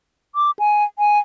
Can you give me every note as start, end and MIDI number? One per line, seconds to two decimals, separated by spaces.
0.35 0.51 86
0.59 0.84 80
0.99 1.19 80